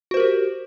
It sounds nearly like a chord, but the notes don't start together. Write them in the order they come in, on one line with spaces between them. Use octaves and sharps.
F#4 C5 A#4 G4